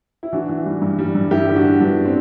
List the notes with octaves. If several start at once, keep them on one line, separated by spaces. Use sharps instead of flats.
E4
E3 D4 F#4
E3
G3
G2
G3
G2
G2 E4 G4
D3
D4 F#4
D3
G2 B3 D4
C4